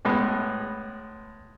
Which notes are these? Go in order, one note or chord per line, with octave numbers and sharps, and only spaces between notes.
A2 G#3 B3